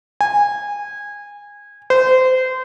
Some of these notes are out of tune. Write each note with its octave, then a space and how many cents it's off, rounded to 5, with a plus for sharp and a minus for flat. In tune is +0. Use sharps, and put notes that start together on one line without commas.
G#5 -20
C5 -25